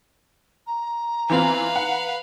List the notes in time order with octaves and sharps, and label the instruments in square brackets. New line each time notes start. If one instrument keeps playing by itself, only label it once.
[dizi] A#5
[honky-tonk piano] E3 C4 F4 [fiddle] B4 F5
[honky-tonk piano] F#5